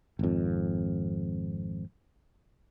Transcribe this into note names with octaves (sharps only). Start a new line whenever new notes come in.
G#1 F2